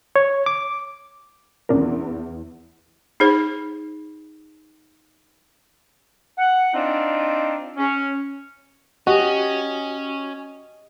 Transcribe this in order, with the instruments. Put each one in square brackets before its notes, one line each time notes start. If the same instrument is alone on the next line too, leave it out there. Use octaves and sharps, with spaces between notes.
[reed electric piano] C#5
D6
[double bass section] E2 [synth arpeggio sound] C#4 D4 A#4
[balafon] D#4 G#4 C5
[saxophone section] F#5
C4 D4 D#4 F4
C#4
[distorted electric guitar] C#4 [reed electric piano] F#4 [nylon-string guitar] G4 [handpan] D#5